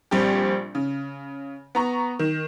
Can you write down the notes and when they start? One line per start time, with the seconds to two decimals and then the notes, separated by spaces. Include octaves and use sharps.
0.11 A#1 G3 C4 G4
0.75 C#3
1.75 B3 A#5 C#6
2.19 D#3